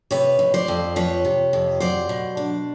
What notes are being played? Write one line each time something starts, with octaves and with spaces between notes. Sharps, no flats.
C3 B4 C#5
F2
C5 D5
F2
F3 B4 C#5
C3
F2
F#3 C5 D5
B2
D4